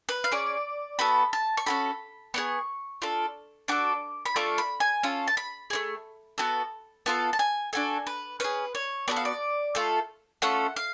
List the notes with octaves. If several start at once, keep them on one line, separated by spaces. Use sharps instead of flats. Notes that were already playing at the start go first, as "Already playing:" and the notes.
B4
F5
C#4 G#4 D5
B3 F#4 A4 B5
A5
C#6
C#4 F#4 A4 B5
B3 D4 G#4 C#6
D4 F4 A4
D4 F#4 A4 D6
B5
A3 D4 F4 A4 C#6
B5
G#5
C#4 F4 A4
A5
B5
A3 C#4 G#4
B3 F#4 A4
B3 F4 A4 A5
A5
G#5
D4 F#4 A4 G#5
B4
C#4 G#4 B4
C#5
B3 F#4 A4 D5
F5
D5
A3 F4 A4
A3 C#4 F4 A4 F#5
F5